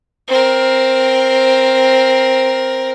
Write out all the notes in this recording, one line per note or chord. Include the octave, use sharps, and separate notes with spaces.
C4 A#4